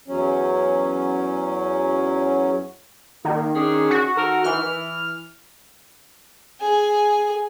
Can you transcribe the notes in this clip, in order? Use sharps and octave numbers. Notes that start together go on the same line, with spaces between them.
E2 F#3 C#4
D#3 A#3
C#4 D4 G#4
F#4
D#3 A4 A#4
D#3 E3 F6
E3
G#4 G#5